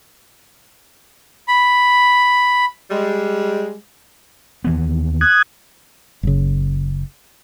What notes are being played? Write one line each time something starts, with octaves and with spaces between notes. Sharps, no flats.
B5
G3 G#3
D#2 E3 B3
D#6 F#6 G#6
F#1 C#3